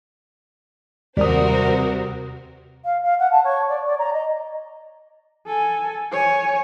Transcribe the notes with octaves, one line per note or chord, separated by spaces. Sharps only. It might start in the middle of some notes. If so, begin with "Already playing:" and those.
D#2 C3 G3 F#4 A#4 C5 D#6
F5
F5
F#5
A5
C#5
D5
D5
A#5
D#5
A4 G#5
C#5 G#5